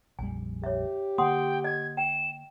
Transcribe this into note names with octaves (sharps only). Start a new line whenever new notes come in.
A#1 F2 G3 G#5
G4 C#5 E5
D3 A#3 F#5 G5 C6 D#6
D#5 G#6
G5 E7